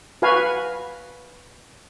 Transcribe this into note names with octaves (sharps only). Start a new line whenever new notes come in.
F#4 B4 F5 G#5